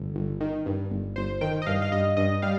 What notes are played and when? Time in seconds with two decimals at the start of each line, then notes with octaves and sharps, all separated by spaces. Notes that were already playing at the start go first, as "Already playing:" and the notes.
Already playing: G1
0.15 G1
0.40 D#3
0.66 G2
0.90 G1
1.16 G1 C5
1.41 D#3 G5
1.62 D#5
1.66 G2 F5
1.82 F5
1.92 G2 D#5
2.17 G2 D#5
2.42 G3 F5